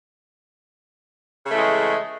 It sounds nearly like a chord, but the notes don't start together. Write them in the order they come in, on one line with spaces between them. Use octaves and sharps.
C#3 A3 E3 G#3